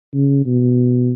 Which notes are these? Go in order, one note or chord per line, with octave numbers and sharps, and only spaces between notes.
C#3
B2